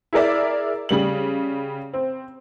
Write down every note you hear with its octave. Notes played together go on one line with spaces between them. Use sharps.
E4 G#4 A#4 D5 E5
C#3 G3 F#7
C4